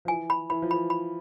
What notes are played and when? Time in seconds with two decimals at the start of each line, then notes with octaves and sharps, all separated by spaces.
0.05 F3
0.08 E3 G#5
0.30 B5
0.50 E3 B5
0.62 F3
0.71 E3 B5
0.90 B5